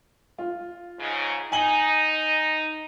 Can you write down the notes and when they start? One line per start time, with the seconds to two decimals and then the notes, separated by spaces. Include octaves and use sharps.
0.38 F4
0.98 G#2 C#3
1.52 D#4 G#5 F#7 G7